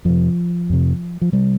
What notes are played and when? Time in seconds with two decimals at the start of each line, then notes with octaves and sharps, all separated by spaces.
0.05 F2 C3 F3
0.69 F2 C3
1.21 F3
1.32 C3 G3